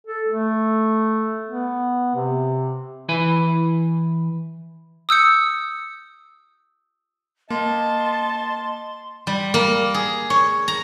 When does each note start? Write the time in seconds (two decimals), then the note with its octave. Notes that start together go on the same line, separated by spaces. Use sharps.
0.07 A4
0.28 A3
1.46 B3
2.15 C3
3.09 E3 E4 B4 G#5
5.09 D#6 E6 G6 C#7
7.50 A#3 D#5 A5 C6
9.27 G3
9.54 A#3
9.94 G#4
10.30 C#5
10.68 A#5